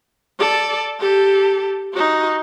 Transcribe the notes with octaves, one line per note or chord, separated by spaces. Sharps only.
A4 D5
G4 A4
D#4 F#4